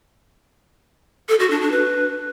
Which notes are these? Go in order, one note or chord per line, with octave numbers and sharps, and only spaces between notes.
A4
F#4
D4
D4
B4